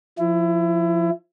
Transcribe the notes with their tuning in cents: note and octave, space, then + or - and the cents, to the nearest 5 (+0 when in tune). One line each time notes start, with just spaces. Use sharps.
F3 +0 E4 +25